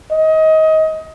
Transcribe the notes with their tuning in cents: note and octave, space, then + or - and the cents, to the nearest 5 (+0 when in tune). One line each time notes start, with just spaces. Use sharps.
D#5 +25